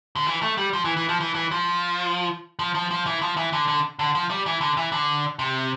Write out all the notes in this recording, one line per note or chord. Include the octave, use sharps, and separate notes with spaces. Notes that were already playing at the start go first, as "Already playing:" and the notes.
D3
E3
A3
G3
F3
E3
E3
F3
E3
E3
F3
F3
F3
F3
E3
F3
E3
D3
D3
D3
F3
G3
E3
D3
E3
D3
C3